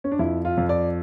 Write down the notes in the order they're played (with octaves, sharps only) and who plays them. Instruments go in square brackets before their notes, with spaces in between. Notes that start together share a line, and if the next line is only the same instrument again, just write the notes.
[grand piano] C#4
D4
F2 E4
F4
F2
D5